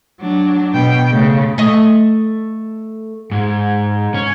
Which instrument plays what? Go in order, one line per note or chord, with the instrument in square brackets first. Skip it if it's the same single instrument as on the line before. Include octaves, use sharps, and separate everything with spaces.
[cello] F#3 D4
B2 G5
C#3 A3
[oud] A3 D#5
[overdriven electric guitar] G#2
C#4